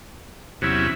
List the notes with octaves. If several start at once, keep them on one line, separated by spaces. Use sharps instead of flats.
E2 C3 F#3 C#4 E4